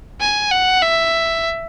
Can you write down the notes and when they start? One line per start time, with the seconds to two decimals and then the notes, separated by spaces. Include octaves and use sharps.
0.20 G#5
0.51 F#5
0.82 E5